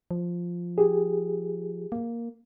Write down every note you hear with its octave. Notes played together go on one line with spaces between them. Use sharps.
F3
G4 G#4
A#3